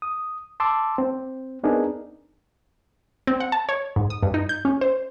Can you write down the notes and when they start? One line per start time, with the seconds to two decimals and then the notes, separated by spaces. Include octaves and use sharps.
0.02 D#6
0.60 A5 C6 D6 E6
0.98 C4
1.63 B3 C4 D4 D#4 G#4 A#4
3.27 C4
3.40 F#5
3.52 A5
3.69 C#5
3.96 G#2
4.10 D#6
4.23 G2
4.34 D#4
4.49 G6
4.65 C#4
4.81 C5